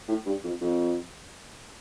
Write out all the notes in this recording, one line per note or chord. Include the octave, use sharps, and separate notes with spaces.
A2
G2
F2
F2